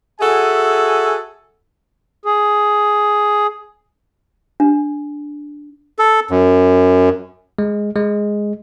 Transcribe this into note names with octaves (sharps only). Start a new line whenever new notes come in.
F#4 G#4 A4 E5 G#5
G#4
D4
A4
F#2
G#3
G#3